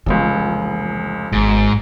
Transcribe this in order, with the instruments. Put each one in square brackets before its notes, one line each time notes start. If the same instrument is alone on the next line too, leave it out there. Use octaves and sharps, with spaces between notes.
[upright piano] F1 C#2 [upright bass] E3 A#3
[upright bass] G#1 B3 [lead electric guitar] G#2